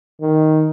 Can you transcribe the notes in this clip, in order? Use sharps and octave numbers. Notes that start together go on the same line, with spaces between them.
D#3